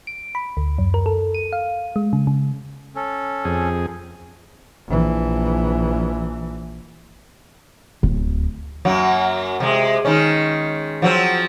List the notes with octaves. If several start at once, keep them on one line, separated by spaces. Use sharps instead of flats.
D7
B5
D2
F#2
A#4
A4
D#7
F5
G#3
C#3
C#3
C#4 A4
F2 G#4
A#1 E3
D1
F#2 F#3 A#3
C3 G#3
D#3 G#3 C#4
F3 F#3 C4